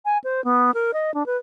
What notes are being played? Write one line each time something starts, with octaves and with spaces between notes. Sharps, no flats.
G#5
C5
B3
A#4
D#5
D4
B4